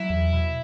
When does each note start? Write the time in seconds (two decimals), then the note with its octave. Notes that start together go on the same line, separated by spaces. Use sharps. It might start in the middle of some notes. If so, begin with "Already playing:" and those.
Already playing: F#3 E4
0.10 E2
0.33 B2